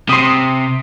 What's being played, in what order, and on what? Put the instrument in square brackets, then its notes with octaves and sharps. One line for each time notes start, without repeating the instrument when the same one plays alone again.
[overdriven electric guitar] C3 [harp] C6 D#6